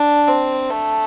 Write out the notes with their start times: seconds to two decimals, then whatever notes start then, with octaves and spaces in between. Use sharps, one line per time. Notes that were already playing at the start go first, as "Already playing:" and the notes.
Already playing: D4
0.28 C4
0.70 A3